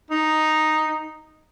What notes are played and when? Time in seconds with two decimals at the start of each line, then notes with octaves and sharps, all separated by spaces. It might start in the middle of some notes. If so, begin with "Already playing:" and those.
0.11 D#4